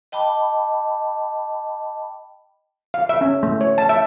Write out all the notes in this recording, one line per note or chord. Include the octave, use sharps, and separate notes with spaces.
D#5 G5 A5 B5 D6
F5
E5
C#4
A3
C#5
A5
E5